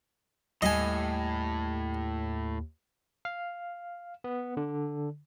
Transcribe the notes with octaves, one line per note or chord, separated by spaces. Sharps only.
D#2 A2 G3 G4 D#5 G#5
F5
B3
D3